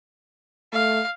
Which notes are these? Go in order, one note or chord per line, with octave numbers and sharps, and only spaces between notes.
A3 F5